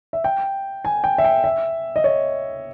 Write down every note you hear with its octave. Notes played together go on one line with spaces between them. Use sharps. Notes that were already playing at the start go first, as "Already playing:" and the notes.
E5
G5
G#5
G5
E5
G5
E5
D#5
C#5